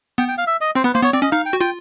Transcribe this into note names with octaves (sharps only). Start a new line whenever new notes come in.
B3 G5
G5
F5
E5
D#5
C4 C5
B3 B4
A#3 C5
B3 C#5
C4 D5
C#4 D#5
D#4 F5
G5
F#4
F4 G5